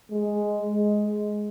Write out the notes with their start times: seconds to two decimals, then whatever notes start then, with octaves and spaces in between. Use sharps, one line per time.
0.11 G#3
0.66 G#3